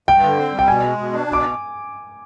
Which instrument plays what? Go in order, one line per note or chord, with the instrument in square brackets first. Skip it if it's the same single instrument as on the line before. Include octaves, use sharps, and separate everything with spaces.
[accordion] G2 [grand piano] G5
[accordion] D3
C4
G3
[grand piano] G5
[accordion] B2 [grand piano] G#5
[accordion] G#3
B2
D4
B2
[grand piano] D6